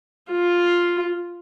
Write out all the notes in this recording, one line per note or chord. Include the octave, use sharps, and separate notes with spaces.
F4